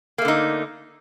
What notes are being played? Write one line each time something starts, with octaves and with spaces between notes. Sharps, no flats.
D3 A3 A#3 D#4